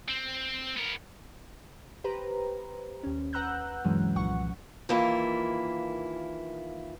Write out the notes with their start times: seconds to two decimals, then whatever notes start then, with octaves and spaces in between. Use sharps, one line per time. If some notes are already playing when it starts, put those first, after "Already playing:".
0.09 C4
0.77 B3 A#4
2.04 G4 B4 C5 A#5
3.03 D#2 C#4
3.33 B4 F#5 A#5 E6 F#6 G6
3.85 G2 C3 E3 F#3 G#3 C#4
4.16 C2 A#2 F3 F#5 C#6
4.89 D#2 E3 A#3 E4 F4